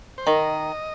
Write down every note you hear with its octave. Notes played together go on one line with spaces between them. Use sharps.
C5
D#3 D#5